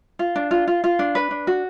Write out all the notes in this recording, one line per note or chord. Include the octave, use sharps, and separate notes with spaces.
F4
D4
F4
F4
F4
D4
B4
D4
F#4